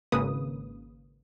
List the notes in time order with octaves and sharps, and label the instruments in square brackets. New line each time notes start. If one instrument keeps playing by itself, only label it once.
[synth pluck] G#1 C#3 A#3 B4 D#6